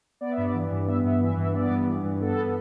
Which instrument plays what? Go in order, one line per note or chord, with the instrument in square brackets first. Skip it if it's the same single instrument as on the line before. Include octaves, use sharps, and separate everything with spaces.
[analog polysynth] B3 D5
E5
G2
D5
E3
G2
B3 E5
G2 E5
E3 E5
G2
E5
B3 D5
G2
E3
G2
B3 A4